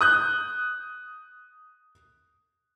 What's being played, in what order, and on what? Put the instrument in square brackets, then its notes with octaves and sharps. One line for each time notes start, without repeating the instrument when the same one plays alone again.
[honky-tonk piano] D#6 F#6 G6